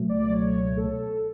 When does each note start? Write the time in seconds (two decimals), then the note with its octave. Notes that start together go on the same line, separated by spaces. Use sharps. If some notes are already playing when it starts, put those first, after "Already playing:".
Already playing: C#2 B2 F#3 A3
0.09 D5
0.32 C#5
0.77 A4